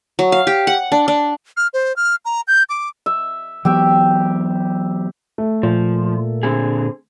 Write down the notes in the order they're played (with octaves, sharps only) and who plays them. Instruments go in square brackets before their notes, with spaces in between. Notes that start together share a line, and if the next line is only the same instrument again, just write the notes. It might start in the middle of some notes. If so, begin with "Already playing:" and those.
[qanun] F#3
F5
G4
F#5
D4
D4
[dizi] F6
C5
F6
A#5
G6
D6
[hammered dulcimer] E5
[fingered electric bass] E3 F#3 B3 [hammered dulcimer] G4 E5 G5
[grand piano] A3
[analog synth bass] A#2 [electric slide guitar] F3
[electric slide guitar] D3 C4 G#4